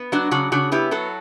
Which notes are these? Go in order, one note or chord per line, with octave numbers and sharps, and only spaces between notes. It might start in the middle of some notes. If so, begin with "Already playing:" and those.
Already playing: B3
F#3 D4 F#4
C#3 D4 F#4
C#3 D4 F#4
B3 E4 G4
F#3 F#4 A4